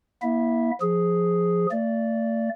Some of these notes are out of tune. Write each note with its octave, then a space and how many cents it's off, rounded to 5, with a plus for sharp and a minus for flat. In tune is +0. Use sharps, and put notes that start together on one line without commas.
A#3 +35 E4 -20 E5 +0
F3 +0 G#4 +0
A3 +45 D5 -5